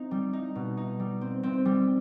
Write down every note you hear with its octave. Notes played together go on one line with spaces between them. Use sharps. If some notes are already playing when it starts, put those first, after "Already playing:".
Already playing: C4 D#4
G3
D#4
B2
D#4
G3
C4
C4
G3